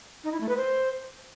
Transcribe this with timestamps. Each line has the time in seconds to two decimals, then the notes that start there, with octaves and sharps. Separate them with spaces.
0.24 D#4
0.32 E4
0.40 A3
0.49 B4
0.57 C5